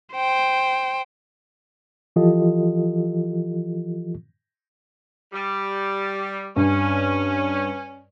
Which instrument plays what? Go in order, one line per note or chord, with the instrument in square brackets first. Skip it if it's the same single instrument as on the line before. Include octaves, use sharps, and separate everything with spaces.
[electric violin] C5 G5
[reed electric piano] E3 F3 F4 G4 A4 D#5
[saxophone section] G3
[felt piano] G2 [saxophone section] C#4